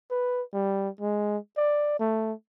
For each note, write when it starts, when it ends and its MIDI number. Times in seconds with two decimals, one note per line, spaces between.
0.11 0.42 71
0.54 0.89 55
1.01 1.37 56
1.57 1.96 74
2.00 2.33 57